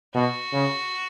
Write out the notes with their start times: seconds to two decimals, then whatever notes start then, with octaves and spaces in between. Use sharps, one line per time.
0.15 B2 F#4
0.53 C#3